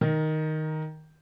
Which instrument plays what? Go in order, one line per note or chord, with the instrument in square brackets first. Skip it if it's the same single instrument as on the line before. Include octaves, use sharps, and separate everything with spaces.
[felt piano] D#3 A#4